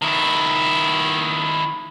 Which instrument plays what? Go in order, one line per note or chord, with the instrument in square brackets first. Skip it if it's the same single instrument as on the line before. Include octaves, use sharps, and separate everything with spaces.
[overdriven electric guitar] D#3 E4